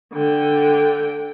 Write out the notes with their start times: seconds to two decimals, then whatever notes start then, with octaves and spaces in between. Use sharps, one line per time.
0.14 D3 G5